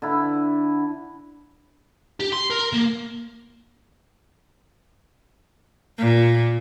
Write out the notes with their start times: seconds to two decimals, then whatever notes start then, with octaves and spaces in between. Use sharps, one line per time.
0.02 D3 E4
2.20 G4
2.33 C6
2.51 A#4
2.73 A#3
5.98 A#2